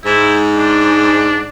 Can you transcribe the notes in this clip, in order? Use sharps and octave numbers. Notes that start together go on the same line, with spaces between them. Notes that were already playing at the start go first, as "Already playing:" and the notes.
G#2 E4
D4